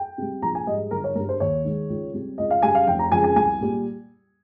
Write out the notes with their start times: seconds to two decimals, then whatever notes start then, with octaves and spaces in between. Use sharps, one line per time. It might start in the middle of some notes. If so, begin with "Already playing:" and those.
Already playing: G5
0.18 C3 G3
0.42 A#1 A#5
0.55 G#5
0.67 G#2 G3 D#5
0.91 G1 A#4
1.04 C#5
1.15 G2 G3 A#4
1.29 C5
1.40 D#2 C#5
1.65 D#3 G#3
1.89 C#2
2.14 C3 G3
2.38 C#2 D#5
2.50 F5
2.62 C#3 G3 G#5
2.75 F5
2.87 F1 G5
2.99 A#5
3.11 F2 C#3 G#3 G#5
3.24 G#5
3.36 C2 G#5
3.60 A#2 G3